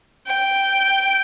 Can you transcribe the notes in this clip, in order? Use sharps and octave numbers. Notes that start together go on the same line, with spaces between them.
G5